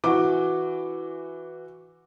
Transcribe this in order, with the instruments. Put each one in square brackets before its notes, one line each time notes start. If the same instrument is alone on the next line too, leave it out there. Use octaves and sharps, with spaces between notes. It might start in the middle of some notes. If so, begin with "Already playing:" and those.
[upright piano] E3 [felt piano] F#4 D6